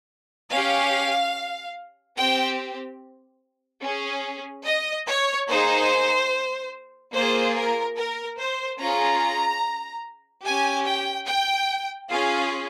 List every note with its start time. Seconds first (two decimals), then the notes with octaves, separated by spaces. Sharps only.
0.51 C#4 G4 F5
2.17 C4 G4 G5
3.82 C#4 G#4
4.65 D#5
5.06 C#5
5.48 A#3 D#4 G#4 C5
7.14 A#3 F4 G#4 C5
7.55 A#4
7.96 A#4
8.38 C5
8.78 C#4 F4 G#4 A#5
10.44 C#4 G4 G#5
10.85 G5
11.27 G5
12.09 C#4 F4 G#4 F5